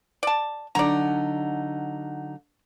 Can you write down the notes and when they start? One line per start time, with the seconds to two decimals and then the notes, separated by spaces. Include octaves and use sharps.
0.23 D5 A5
0.75 D3 F#3 D#4 D5 A#5